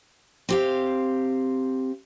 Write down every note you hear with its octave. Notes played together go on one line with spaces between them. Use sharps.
C4 G4 F5